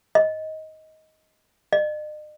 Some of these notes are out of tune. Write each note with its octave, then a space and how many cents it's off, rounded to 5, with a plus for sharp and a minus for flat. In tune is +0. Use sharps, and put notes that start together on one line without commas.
D#5 +15
D#5 -45